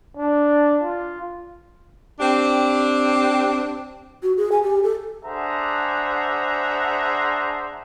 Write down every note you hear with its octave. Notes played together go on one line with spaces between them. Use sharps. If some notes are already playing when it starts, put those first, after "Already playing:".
D4
F4
C4 D4 G4
F#4
G#4
G#5
G4
A4
D4 G#4 C5 E5 F#5 A#5